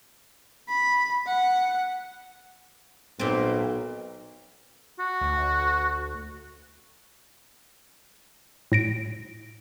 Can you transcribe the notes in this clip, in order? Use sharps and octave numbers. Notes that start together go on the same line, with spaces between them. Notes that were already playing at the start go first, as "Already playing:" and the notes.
B5
F#5
B1 A#2 C4
F#4
D2
A2 A#6 D7